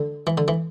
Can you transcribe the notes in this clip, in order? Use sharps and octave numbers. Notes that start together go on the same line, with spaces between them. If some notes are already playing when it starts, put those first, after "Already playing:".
Already playing: D3
E3
D3
E3